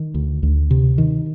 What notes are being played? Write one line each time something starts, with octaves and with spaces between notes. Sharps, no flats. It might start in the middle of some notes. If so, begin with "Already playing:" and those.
Already playing: D#3
D2
D2
C3
D#3